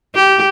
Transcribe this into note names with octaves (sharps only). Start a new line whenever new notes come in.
G4